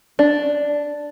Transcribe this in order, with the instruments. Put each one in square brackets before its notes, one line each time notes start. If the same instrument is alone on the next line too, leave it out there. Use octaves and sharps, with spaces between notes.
[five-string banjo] D4